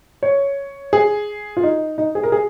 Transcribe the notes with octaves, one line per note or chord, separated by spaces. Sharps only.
C#5
G#4
F4
D#4
D#4
G#4
A#4
G#4